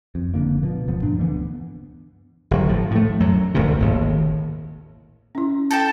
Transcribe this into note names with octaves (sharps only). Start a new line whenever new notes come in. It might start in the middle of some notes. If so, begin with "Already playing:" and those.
F2
F#1 D3 A#3
B2 F3
D#1 F3 B3
G2 D4
D2 E3 A3 B3
G1 F#3
A2 F3
A2 A3
F#2 F#3
E1 D2 A2 C3
G#1 D#2 A2
C#4 E4
A4 G5 A5